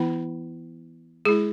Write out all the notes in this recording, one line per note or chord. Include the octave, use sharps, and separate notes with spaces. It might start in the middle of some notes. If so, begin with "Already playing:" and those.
Already playing: E3 B3 E4
G#3 E4 G#4